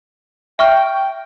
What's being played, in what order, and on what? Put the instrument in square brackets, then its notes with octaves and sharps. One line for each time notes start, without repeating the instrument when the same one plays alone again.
[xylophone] E5 C#6 F6 [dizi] G5